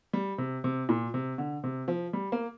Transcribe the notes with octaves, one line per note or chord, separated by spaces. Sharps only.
G3
C3
C3
A#2
C3
D3
C3
F3
G3
A#3